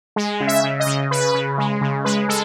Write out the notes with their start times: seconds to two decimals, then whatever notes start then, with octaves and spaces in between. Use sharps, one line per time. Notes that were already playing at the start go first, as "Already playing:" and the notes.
0.16 G#3
0.40 C#3
0.47 E5
0.64 C#3
0.80 D#5
0.86 C#3
1.11 C#3 B4
1.34 C#3
1.58 G#3
1.81 C#3
2.05 G#3 B4
2.29 G#3 A4